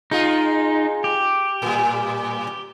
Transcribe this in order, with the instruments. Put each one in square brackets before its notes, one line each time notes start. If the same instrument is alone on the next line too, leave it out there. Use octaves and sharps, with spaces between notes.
[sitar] G#3 F4 [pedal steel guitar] D#4
[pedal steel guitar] G4
[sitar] A2 G3